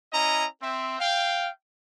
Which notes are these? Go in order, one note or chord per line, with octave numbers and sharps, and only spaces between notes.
C#4 E4 D#5 A#5
C4 E5
F5 G5